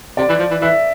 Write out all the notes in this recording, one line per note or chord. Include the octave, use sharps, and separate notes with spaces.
C3 D5
E3
F3
E3
E3 E5